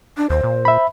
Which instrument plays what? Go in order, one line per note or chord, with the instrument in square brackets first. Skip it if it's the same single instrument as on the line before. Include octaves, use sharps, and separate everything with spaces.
[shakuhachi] D4
[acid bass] D#2 [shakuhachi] C5
[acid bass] A#2
[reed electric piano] E5 B5